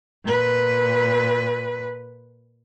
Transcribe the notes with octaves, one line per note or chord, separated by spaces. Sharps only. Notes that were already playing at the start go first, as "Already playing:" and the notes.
A#2 B4